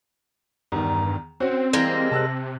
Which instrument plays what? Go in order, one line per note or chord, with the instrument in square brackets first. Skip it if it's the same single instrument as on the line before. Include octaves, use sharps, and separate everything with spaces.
[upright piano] E2 D#3 [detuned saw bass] G2 [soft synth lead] A#5
[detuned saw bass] C4 [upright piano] C#4 F#4 [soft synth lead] C5
[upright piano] E3 [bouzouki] G3 G#3 A#3 [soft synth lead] A#6
[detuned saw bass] C3 [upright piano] A5 E6 F#6